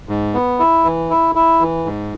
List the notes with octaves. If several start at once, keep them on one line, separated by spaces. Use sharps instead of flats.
G#2
B3
E4
E3
E4
E4
E3
G#2